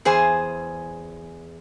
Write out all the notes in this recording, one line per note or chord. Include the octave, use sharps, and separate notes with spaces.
E2 G#4 C5 G#5